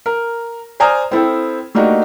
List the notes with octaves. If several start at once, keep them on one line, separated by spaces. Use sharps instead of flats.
A#4
C5 D5 G#5 A#5 D#6 F6
C4 E4 A4 G5
A3 A#3 D4 D#4 F#4 G4